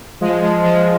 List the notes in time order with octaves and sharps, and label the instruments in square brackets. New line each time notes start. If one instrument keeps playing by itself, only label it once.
[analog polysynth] F3 G#3
F3 G#3
F3 G#3